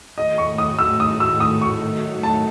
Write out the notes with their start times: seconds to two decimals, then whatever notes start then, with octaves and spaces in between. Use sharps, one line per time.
0.17 D#3 A3 D#4 F#4 D#5
0.38 C#6
0.58 D#6
0.79 E6
1.00 D#6
1.20 E6
1.40 D#6
1.61 C#6
1.82 D#3 F#3 A3 D#4 F#4
2.23 A5